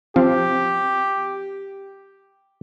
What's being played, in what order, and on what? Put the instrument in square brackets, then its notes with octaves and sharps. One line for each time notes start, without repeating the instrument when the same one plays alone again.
[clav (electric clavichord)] F3 [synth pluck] C4 F5 [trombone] G4